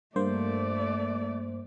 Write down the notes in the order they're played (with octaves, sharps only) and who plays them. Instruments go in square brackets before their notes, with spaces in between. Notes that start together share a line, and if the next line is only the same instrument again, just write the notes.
[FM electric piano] G2 A#3 C5 [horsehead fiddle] A3 D5